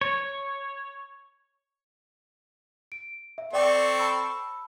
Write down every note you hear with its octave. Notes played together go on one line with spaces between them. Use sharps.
C#5
D7
E5
C4 A4 D5 G5 C#6 D6
A5 B5 E6